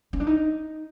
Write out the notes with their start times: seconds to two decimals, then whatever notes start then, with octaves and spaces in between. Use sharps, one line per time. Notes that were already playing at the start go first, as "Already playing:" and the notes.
0.13 C#4
0.20 D4
0.27 D#4